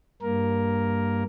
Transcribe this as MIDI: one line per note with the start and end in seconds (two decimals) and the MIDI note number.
0.22 1.23 43
0.22 1.23 58
0.22 1.23 70